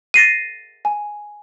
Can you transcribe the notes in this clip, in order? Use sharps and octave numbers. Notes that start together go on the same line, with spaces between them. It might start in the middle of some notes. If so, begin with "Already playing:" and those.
A6 A#6 C7 D#7
G#5